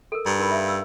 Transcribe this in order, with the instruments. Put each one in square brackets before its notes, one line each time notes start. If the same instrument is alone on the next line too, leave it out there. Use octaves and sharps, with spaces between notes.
[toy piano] A4 A#4
[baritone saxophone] G2 [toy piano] A#5
[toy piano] D#4 A#4 B5
E5 F5
F5 E6